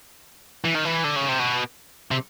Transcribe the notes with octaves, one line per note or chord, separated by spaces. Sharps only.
E3
D#3
E3
D3
C#3
C3
B2
C3